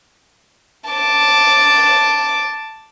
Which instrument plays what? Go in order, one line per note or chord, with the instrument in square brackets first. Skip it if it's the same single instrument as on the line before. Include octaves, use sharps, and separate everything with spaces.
[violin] A5 D6